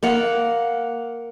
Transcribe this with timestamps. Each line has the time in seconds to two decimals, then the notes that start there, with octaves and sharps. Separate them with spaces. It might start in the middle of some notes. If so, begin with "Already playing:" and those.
0.03 A#3 F5 F#5